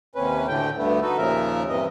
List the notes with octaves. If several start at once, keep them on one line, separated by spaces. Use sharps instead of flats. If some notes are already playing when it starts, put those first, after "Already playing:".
D#2 C3 C#4 B4
D2 A2 D3 A3 G5
D2 G2 D3 A3 B3
D#4 F#4 A4 B4
D#2 A#2 C#3 F3 A#4 E5
G2 C3 E3 D#5